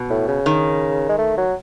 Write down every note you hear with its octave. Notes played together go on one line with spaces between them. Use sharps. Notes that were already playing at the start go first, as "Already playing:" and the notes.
Already playing: B2
A2
C#3
D#3
G#3
A3
F#3